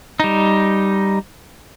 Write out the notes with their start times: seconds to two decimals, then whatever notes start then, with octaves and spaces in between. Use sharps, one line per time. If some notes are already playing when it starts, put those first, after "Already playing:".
0.20 G3 D#4